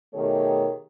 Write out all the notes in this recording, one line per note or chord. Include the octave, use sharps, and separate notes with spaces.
B2 D#3 A3 G4 G#4 C#5